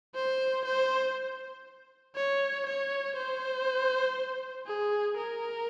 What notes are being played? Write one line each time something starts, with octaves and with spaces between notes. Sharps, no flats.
C5
C5
C#5
C#5
C5
G#4
A#4